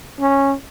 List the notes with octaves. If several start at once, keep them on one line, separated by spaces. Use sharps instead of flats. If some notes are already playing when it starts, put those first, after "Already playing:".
C#4